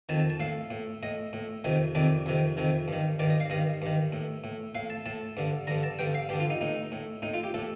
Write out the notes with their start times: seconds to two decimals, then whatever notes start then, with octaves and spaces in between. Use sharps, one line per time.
0.09 F2 D#3 A5
0.20 A5
0.30 A5
0.40 A2 F5
0.71 A2
1.03 A2 D#5
1.33 A2
1.64 F2 C3 D#3
1.95 F2 C3 D#3 D5
2.26 F2 C3 D#3
2.57 F2 C3 D#3
2.88 G2 D#3
3.19 G2 D#3 D5
3.30 D#5
3.40 F5
3.50 G2 D#3 D#5
3.82 G2 D#3
4.13 A2
4.44 A2
4.75 A2 F5
4.90 A5
5.06 A2 A5
5.37 G2 D3
5.67 G2 D3 A#5
5.83 A5
5.99 G2 D3 G5
6.14 F5
6.29 G2 G4
6.33 D3
6.40 F4
6.50 D#4
6.61 A2 D#4
6.92 A2
7.22 A2 D#4
7.34 F4
7.44 G4
7.54 A2 A4